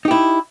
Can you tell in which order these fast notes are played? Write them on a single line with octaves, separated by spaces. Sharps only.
D#4 G4 E4